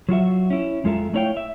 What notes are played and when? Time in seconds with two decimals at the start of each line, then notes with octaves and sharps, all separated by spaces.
0.09 F#3 F4 F#4 E5
0.50 C#4 E4
0.84 F2 G#3 F4 A4 E5 A#5
1.13 A3 D4 E4 C#5 F5 G5
1.37 E5